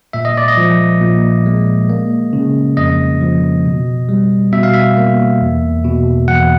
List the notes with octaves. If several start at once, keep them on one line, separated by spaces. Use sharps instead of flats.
A#2 E5
D#5
D5
D#5
F3
A#2
G#3
A#3
C#3
F2 D#5
F3
B2
G3
B2 E5
F5
E5
A#3
E2
B2
E2 F#5